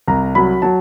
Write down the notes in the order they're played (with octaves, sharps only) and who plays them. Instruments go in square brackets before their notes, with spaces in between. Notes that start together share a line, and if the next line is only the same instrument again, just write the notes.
[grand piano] C2 A#5
F#3 B5
F#3 A5